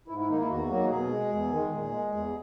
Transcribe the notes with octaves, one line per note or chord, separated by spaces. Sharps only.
G#2 E4
E4
D#3 A#3 D#4
E4
E2 F#4
D#3 F#3 A#3
B2 G#4
G#3
E2
D#3 G#3
A#2
G#3
E2